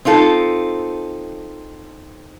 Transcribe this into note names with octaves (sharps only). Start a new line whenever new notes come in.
C4 D#4 F4 A4